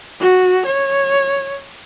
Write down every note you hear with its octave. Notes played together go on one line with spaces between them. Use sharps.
F#4
C#5